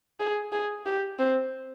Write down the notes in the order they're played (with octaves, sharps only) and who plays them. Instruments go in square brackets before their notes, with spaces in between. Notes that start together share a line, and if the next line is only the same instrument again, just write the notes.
[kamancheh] G#4
G#4
G4
C4